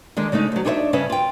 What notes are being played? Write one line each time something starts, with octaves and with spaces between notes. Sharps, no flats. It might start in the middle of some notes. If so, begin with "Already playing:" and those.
D3 D#3 G#3
C#3 G#3 A3 D#4
D2 F#3
D4 D#4 G#4 C5 C#5 E5
G2 C#3 C#4 B4 E5
F4 G5